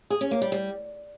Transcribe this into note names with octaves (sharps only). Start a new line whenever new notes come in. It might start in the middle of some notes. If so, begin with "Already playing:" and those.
G#4
C#4
A#3
G3
G3